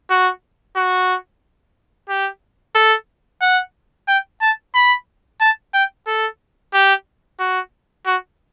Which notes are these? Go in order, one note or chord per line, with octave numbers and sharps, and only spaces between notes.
F#4
F#4
G4
A4
F#5
G5
A5
B5
A5
G5
A4
G4
F#4
F#4